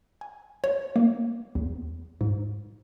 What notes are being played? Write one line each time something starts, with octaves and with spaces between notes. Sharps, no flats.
G#5
C#5
A#3
E2
G#2